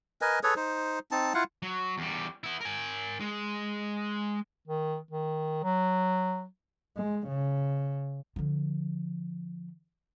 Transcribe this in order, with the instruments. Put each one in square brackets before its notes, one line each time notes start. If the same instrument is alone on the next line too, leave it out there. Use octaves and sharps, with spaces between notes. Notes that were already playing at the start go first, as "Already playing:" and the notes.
[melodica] A#4 B4 D#5 G#5
G#4 A4 B4 C#5
D#4 C5
C4 D#4 A5
E4 F4 F5 F#5
[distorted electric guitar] F#3
E2 G3
B3 E4
A#4 G#5
G#3
[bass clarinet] D#3
D#3
F#3
[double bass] G#3
C#3
[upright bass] D3 F3